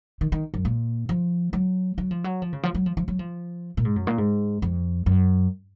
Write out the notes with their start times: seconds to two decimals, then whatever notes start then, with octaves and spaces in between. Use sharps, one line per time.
0.21 D#3
0.32 D#3
0.54 F#2
0.65 A#2
1.09 F3
1.53 F#3
1.98 F#3
2.11 F3
2.24 F#3
2.42 F3
2.53 C#3
2.63 F3
2.75 F#3
2.86 F3
2.97 F3
3.08 F#3
3.19 F3
3.77 A#2
3.85 G#2
3.96 F#2
4.07 A#2
4.18 G#2
4.62 F2
5.06 F#2